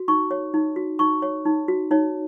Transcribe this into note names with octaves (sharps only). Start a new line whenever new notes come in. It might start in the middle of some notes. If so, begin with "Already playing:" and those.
Already playing: F#4
D#4 C#6
C#5
D#4
F#4
D#4 C#6
C#5
D#4
F#4
D#4 C#5